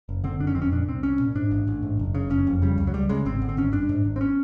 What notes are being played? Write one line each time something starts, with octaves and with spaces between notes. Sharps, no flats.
F#1
D3 C4
F#1 D4
C#4
F2 C4
C#4
A#2 D4
C2 C4
C2 C#4
A#2
G#2 D4
A1
A1
G#2
F#1
C#3
F#1 C#4
F2
C#3 G3
C#2
F#3
C#2 G3
C#3 G#3
G#1 C4
D3
C4
G#1 C#4
G2 D4
G#2
G#1
C4
C#4